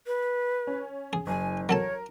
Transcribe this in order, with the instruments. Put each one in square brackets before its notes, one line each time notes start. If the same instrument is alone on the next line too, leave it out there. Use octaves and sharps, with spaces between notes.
[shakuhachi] B4
[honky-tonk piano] C#4
[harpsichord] G#4
[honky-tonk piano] F#1 [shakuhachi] G#5
[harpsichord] F#3 A4 A5 [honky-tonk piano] A#4 [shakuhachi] C#5